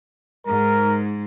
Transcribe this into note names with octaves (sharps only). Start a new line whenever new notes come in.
G#2 A#4